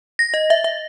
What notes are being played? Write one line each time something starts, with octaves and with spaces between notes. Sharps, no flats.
A#6
D#5
E5
E5